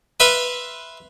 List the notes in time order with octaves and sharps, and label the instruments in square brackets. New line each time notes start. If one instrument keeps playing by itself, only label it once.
[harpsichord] B4 E5 F5 B5 C6